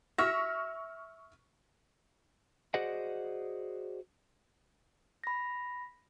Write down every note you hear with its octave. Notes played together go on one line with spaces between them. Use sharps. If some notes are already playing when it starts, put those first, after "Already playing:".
E5 C#6 F6 A#6
F#4 G#4 C5 D5 D#5 F#5
B5 A#6